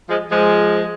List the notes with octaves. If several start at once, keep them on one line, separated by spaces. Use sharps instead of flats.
F3 G#3
F3 G#3